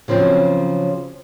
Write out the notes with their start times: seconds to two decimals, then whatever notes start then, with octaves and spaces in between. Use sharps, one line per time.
0.08 C#3 F3 F#3 C4